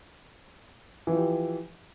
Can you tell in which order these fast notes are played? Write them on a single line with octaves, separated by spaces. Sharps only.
E3 F3 G4